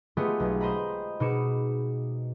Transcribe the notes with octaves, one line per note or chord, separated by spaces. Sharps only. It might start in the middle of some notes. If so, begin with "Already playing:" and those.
G#3 A3 B3 F4 G4 G#4
B1
C5 D#5 A#5 B5
B2 D#4 G#4 D6 C#7 E7